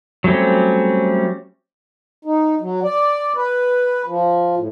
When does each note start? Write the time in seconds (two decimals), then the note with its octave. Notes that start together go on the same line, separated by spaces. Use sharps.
0.24 F#3 G3 A3 C4 C#4
2.25 D#4
2.61 F#3
2.83 D5
3.36 B4
4.06 F3
4.57 A2